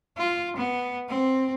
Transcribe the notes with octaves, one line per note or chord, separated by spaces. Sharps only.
F4
B3
C4